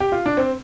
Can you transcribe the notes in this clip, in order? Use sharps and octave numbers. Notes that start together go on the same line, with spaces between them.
G4
F4
D4
C4